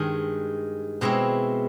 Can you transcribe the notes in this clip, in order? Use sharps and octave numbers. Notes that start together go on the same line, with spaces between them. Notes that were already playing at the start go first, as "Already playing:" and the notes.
Already playing: G2 D#3 G#3
B2 G#3 C4 E4